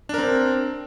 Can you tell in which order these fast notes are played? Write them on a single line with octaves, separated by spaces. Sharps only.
D4 A#4 C4